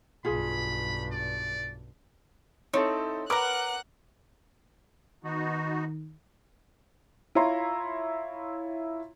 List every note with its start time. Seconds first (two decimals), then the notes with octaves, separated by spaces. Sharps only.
0.25 B1 G2 F4 G#4 B5
1.12 D5
2.73 C4 D#4 E4 A4 C#5
3.30 A#4 B4 F#5 A#5 D6 F#6
5.24 D#3 B3 D#4 F#4
7.35 E4 F4 C#5 A#5 C6